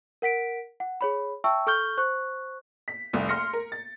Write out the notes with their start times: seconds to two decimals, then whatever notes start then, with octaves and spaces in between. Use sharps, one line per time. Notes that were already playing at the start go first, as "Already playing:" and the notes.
0.22 A#4 F#5 B6 D7
0.80 F#5
1.01 G#4 C#5 B5
1.44 E5 G5 A5 C#6 E6
1.67 A4 C#6 F6 G6 G7
1.98 C5 C#6 F#6
2.88 B6
3.13 F1 C2
3.29 C6 F6 A#6 C#7
3.53 A#4
3.72 A6